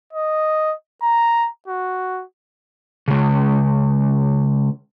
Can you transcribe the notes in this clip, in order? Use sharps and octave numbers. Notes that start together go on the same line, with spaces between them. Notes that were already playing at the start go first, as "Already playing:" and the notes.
D#5
A#5
F#4
C#3 G#3